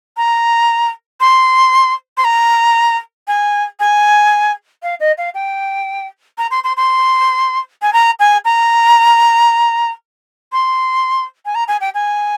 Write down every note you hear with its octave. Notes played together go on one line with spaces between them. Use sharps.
A#5
C6
C6
A#5
G#5
G#5
F5
D#5
F5
G5
A#5
C6
C6
C6
G#5
A#5
G#5
A#5
C6
G#5
A#5
G#5
G5
G#5